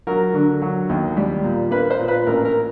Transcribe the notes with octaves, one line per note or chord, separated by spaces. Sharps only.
F#3 A#4
D3
F#3
D#2
G3
A#2
A#3 B4
C5
A#2
B4
A1 A#4
A#4